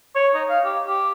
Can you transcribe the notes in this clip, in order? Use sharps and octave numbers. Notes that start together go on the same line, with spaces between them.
C#5
D#4
F5
G4
G4